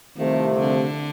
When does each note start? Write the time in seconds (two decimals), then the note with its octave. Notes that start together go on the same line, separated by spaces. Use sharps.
0.17 C2 C3 D#3 F3 A3
0.59 D3